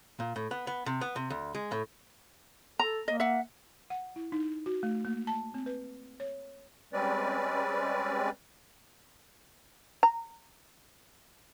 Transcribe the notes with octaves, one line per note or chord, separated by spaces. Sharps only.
A#2
A2
B3
B3
C3
B3
C3
D2
G#3
A2
A4 A#5
A#3 D#5
E5 F#5
F#5
E4
D#4
F#4
A3
A#3
A5
C4
B4
C#5
G3 G#3 C4 C#4 B4 D5
A#5